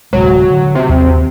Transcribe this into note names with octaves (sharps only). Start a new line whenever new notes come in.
D1 C3 F#3 G#3
D3
C3
D#2 F3